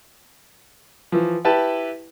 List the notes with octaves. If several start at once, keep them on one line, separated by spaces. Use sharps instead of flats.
E3 F3
E4 G4 B4 A5